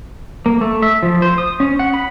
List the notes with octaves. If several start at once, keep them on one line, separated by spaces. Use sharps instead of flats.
A#3
A3
E5
F3
C5
D#6
C#4
F#5
B5